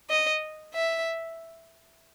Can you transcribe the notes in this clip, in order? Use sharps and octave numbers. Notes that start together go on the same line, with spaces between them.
D#5
E5